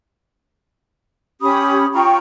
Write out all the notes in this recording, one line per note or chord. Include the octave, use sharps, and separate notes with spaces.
C#4 G4 B5 D#6
F4 G5 A#5 C#6